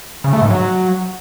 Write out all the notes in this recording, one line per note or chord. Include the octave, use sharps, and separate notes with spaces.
C#3
A3
G#2
F#3